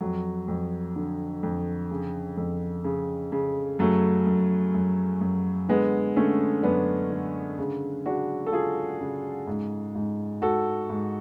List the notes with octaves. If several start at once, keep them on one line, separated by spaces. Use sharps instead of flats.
F2 F#3
F2
D3
F2
C#3
F2
C#3
C#3
F#2 F#3 A3
F#2
F#2
F#2
D3 G#3 B3
D3 A3 C#4
F#2 B3 D4
D3
C#3
C#3 D4 F#4
A4
C#3 F4 G#4
C#3
G#2
G#2
G#2 F#4 A4
G#2